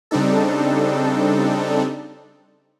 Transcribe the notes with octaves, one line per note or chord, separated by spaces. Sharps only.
C#3 G3 C4 D4 D#4 A4